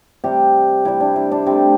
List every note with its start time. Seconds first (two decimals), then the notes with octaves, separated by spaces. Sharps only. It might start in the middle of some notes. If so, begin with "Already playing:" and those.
0.24 C3 G3 G4
0.85 C3 G3 E4
1.01 D4
1.16 E4
1.31 D4
1.46 C3 A3 C4